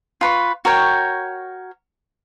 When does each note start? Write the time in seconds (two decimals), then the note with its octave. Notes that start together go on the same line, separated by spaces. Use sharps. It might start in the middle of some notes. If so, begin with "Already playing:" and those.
0.21 F4 B4 C#6
0.65 F#4 A#4 C#5 G5